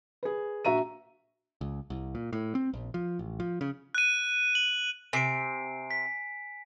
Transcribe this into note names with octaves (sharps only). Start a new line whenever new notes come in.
G#4 B4
A#1 F#4 E5 A#5 D#7
C#2
C2
A#2
A2
C4
A#1
F3
A1
F3
C#3
F#6 D#7
F#7
C3 G#5 C7 D7
B6